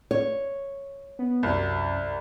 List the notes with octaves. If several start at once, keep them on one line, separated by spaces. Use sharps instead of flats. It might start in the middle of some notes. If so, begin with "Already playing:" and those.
C#5
B3
C2 F#2